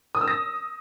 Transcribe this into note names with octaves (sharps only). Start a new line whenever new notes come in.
D#6
E6
A#6